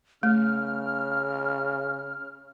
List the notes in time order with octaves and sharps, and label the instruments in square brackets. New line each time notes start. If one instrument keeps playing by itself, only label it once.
[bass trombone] C#3 [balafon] A3 [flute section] F6